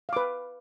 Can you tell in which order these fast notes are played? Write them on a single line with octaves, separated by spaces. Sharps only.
F5 D6 B4